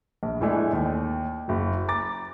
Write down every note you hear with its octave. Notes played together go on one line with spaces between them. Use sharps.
A#1
E2 A2 E3 G#3 A3 D4
D#2
F#1 F#3
A#5 D6 A6